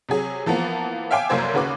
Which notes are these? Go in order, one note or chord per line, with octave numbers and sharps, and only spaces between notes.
C3 F#3 G#4
E3 F3 A#3 B3
E5 F5 G5 G#5 D6
F1 C2 F#2 A#3 C5 G#6
D#2 C#3 F#4 B4 D6